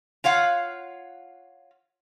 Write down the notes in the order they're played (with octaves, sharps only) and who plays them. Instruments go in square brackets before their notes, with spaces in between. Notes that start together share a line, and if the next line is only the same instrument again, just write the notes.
[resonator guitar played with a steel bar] F4 C#5 F5 F#5